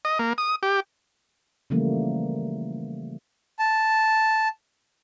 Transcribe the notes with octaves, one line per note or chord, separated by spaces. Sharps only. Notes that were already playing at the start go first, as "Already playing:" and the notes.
D#5
A#3
D#6
G4
C#3 E3 F3 G3 A3 A#3
A5